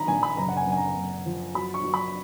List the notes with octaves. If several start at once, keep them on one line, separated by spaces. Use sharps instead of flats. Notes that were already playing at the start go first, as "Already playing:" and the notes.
Already playing: D#3 F#3 A#5 B5
A#1 G#5
B5
F#1 A#5
F#5
G#5
F#1
G#5
A#5
F#1
F3
F#3 B5
C#6
F#3
B5